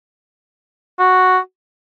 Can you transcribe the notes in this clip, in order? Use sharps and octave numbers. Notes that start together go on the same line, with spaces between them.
F#4